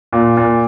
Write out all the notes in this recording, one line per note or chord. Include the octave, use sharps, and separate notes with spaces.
A#2
A#2